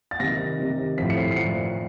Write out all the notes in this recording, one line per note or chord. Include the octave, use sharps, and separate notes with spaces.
A6
C3 D#3 A#6
C3 D#3
A2 F3 B6
C#7
C7
C7
A2 F3 C#7